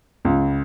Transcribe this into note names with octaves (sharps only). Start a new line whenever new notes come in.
C#2